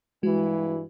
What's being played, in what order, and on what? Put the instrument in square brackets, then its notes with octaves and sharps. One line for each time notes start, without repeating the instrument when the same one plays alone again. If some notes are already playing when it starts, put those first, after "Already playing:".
[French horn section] G2 E3 [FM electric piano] G#3 F#4